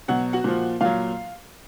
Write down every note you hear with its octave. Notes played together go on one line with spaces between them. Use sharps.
B2 F#3 F#5
F#4 F#5
A#2 F3
A#2 F#3 F4 F5